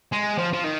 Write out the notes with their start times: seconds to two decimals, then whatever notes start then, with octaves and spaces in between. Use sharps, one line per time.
0.12 G#3
0.38 F3
0.53 F3
0.64 D#3